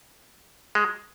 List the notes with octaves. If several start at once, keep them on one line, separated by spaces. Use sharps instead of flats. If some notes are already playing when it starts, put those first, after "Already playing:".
G#3